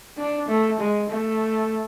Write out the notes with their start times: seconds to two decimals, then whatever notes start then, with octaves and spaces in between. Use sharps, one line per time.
0.17 D4
0.48 A3
0.79 G#3
1.09 A3